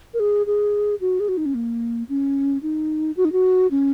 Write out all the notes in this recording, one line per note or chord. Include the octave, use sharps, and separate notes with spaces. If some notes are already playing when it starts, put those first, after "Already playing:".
A#4
G#4
G#4
F#4
G#4
F#4
D#4
C#4
A#3
C#4
D#4
F#4
D#4
F#4
C#4